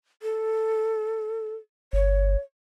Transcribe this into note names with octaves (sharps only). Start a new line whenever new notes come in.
A4
G1 C#5